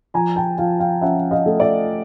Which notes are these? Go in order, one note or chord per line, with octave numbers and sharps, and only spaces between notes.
F3 G#5 A#5
G5 A5
F3 F5 G5
F5 G5
C#4 E5 F#5
D#5 F5
A3
D5 E5